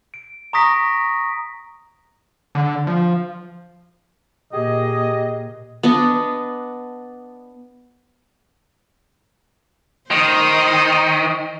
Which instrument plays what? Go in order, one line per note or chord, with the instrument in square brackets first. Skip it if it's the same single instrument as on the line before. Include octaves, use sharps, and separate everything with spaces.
[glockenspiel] D7
A#5 C#6 D#6 A#6 B6 D7
[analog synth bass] D3
F3
[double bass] A#2 [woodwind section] G4 G#4 D#5
[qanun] B3 D4 D#5
[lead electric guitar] D#3 [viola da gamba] C5 D#5